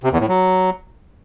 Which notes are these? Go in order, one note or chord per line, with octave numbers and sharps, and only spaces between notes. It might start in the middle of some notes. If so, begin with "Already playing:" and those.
C3
E2
A2
F#3